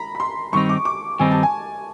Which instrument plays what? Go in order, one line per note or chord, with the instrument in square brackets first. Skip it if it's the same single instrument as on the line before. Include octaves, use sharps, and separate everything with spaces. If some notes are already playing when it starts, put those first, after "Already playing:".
Already playing: [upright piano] A#5 B5
B5
C6
[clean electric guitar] G2 D#3 G3 C4 D#4 [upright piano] C#6
[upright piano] D6
D6
[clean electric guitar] G2 D#3 G3 C4 D#4 [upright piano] G#5
[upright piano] A5
G#5